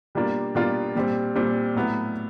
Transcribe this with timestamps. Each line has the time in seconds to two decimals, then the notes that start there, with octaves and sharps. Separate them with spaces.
0.15 B2 G3 A#3 D4 F4
0.55 B2 G3 A#3 D4 F4
0.95 A#2 G3 C4
1.35 A#2 G3 C4
1.75 A2 F#3 B3 E4